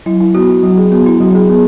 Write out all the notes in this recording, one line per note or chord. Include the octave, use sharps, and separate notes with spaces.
F#3 E4
E4
B3 F#4
F#4
F#3 F#4
G#4
B3 F#4
E4
F#3 F#4
G#4
B3 G#4